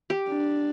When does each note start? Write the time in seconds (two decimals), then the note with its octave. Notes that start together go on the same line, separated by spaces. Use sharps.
0.10 G4
0.28 D4